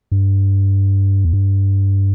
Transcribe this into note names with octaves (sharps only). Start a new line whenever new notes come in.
G2
E2
G2